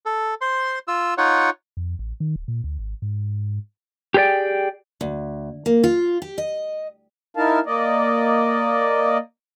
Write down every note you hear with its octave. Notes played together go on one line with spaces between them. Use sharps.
A4
C5 C6
F4 E6
D#4 F4 C#5 F#5
F2
A1
D#3
D1
A#2
D2
G#1
G#2
G4 G#4 B4 D5 G5
D2
A#3
F4
G4
D#5
D#4 E4 A#4 F5 A5
A#3 D5 D#5